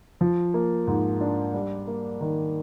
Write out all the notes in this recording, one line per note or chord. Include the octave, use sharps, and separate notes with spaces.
F3
A#3
G#2
D4
G3
A#3
D#3